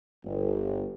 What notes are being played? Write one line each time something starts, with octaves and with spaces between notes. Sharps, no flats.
G1